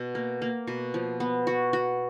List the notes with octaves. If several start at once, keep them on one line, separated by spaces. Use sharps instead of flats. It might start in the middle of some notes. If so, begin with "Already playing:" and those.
Already playing: B2
A#3
A#3
B2
F3
B3
F#4
F#4